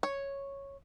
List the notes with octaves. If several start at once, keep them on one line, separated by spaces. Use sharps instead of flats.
C#5